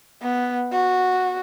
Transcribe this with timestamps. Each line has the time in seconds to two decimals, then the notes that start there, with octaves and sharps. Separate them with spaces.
0.22 B3
0.73 F#4